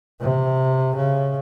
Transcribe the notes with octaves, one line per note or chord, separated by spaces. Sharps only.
C3
C#3